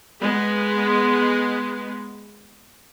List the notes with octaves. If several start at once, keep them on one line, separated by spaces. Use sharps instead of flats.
G#3 B3